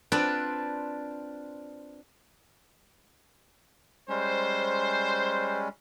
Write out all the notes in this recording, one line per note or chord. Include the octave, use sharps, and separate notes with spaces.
C4 D4 F4 B4 C5 D5
G3 G#3 C#4 C5